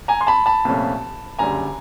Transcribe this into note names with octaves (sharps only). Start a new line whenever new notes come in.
G#5 A#5
C6
A5 B5
A5 B5
C2 A#2 F3 A3 C#4
F#1 F#2 D3 G3 G#5 A#5